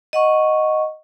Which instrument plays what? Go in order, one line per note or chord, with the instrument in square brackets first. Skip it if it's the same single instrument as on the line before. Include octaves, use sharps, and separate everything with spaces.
[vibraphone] D#5 F#5 C#6